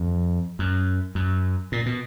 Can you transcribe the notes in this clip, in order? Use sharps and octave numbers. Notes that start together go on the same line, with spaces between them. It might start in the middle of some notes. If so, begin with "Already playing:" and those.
Already playing: F2
F#2
F#2
A#2
B2